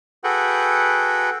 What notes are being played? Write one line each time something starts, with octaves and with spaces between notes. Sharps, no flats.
F#4 G#4 A4 B4 F#5 G5